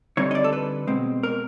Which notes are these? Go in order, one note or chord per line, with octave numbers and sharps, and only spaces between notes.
D3 G3 C4 D#4 C#5
D#5
D5
A4
B4
B2 G#3 C4
A#4